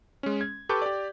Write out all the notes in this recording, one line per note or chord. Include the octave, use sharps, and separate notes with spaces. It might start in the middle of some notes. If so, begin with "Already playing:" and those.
G#3 C#4
G#6
G4 A4 B4 C#6 D6 G6
G4 D5